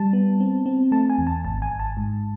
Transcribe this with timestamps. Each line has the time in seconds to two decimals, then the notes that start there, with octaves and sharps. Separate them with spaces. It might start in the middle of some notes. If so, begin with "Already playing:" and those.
Already playing: G3 A5
0.13 B3
0.40 C4
0.66 C4
0.92 A3 A5
1.10 G#5
1.18 E2
1.27 A5
1.44 G#1 A5
1.62 G#5
1.71 G#1
1.79 A5
1.97 G#2